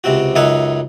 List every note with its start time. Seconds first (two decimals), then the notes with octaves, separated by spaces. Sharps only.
0.04 C#2 C3 C4 F#4
0.35 C#2 F#2 D#4 E5 F#5 G#5